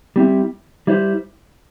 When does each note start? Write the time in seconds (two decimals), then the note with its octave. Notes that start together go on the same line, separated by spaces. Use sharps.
0.16 G3 C4 E4
0.87 G3 E4 C5